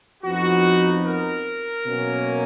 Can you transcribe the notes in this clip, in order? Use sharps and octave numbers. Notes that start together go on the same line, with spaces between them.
F2 F3 B3 D#4 F#4
A#4
B2 F#3 A#3 C#4